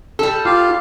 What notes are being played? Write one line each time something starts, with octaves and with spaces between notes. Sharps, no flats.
G3 A4
F4 G4 F5